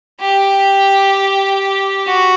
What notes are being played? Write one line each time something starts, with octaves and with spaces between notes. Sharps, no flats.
G4
F#4